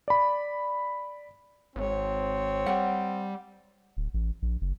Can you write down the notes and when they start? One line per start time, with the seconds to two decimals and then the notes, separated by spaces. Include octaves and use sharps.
0.08 D5 B5
1.76 G#1 C4 C#5
2.66 G3 F#5
3.97 D1
4.14 A1
4.42 A#1
4.61 F#1